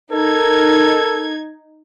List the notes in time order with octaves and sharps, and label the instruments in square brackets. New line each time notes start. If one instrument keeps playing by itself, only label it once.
[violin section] D#4 G#6 [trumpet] A4 [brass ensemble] A#4